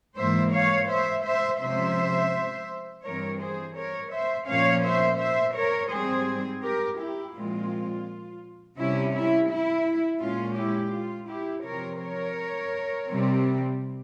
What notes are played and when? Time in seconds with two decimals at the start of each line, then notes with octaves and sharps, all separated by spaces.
0.18 G#2 E3 A#3 C5 E5
0.54 C#5 F5
0.89 C5 E5
1.25 C5 E5
1.61 C3 F3 G#3 C#4 C5 E5
3.04 G2 E3 G3 C4 A#4 C#5
3.40 G#4 C5
3.76 A#4 C#5
4.11 C5 E5
4.47 A#2 F3 A#3 C#4 C#5 F5
4.84 C5 E5
5.19 C5 E5
5.55 A#4 C#5
5.91 G#2 G3 C4 G#4 C5
6.63 G4 A#4
6.99 E4 G4
7.35 A#2 F3 G#3 C4 F4
8.78 C3 G3 C#4 E4
9.13 E4
9.50 E4
10.21 A#2 G#3 C#4 F4
10.57 E4 G4
10.93 F4
11.29 E4 G4
11.64 C3 F3 C4 A#4 C#5
12.00 A#4 C#5
13.08 C3 G3 C4